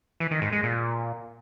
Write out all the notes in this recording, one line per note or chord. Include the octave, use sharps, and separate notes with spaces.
E3
D#3
G#2
G#3
A#2